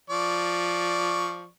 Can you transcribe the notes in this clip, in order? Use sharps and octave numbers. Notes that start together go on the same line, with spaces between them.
F3 D5 C#6